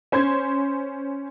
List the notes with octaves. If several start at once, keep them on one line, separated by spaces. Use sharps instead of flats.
C#4 C5 C6 G#6